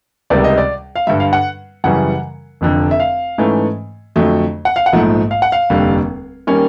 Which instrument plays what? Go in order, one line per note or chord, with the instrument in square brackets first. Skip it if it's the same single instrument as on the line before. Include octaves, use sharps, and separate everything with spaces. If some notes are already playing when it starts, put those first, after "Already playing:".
[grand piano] C#2 C3 D#3 G3 C4 D5
D#5
D5
F5
G2 D3 G3 E5
F5
F#5
F#2 C#3 E3 G3 F#5
F1 F2 D3
E5
F5
G#2 E3 A3 C#4
F2 D3 F#3 A3
F#5
F5
F#5
A#1 G#2 F3 A3
F5
F#5
F5
F1 D#2 D3 G3
D#3 G3 A#3 C#4